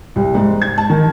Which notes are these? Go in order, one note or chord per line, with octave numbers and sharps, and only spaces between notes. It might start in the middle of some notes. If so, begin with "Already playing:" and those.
C2
G#2
G#6
A5
D#3